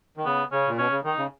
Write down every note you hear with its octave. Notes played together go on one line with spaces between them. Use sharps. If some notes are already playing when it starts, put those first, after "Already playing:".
D#3
C#3 B3
C#3 C#4
A#2
B2 C#4
C#3
D#3 D#4
C#3